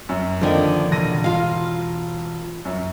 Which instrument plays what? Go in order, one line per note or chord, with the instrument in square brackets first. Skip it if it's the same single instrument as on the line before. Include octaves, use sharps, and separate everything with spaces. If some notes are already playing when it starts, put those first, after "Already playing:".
[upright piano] F#2
[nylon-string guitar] D3 D#3 [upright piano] F3 A#3 D4
[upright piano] E1 A#6 D#7
[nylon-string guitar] F4 F5
[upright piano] F#2